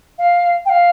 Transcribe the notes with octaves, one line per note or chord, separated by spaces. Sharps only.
F5
G5
F5